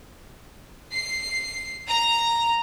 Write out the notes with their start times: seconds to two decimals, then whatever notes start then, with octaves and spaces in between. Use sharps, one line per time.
0.93 C7
1.88 A#5